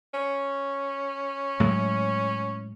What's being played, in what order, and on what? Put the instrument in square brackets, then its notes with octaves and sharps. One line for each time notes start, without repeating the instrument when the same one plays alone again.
[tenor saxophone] C#4
[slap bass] A2 F#3 G#3